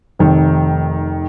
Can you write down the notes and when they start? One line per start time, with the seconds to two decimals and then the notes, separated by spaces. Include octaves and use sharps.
0.19 F1 D#3